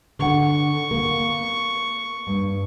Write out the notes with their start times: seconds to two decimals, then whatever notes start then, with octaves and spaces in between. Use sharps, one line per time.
0.19 D3 F#5 C#6
0.91 A#3
2.27 G2